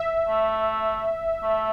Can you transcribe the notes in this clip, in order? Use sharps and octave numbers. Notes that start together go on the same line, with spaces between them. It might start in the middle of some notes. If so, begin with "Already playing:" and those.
Already playing: E5
A3
A3